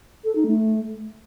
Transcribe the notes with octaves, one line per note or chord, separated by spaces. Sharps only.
A4
D#4
A3